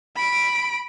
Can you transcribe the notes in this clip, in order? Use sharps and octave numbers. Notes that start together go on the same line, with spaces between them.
B5 D7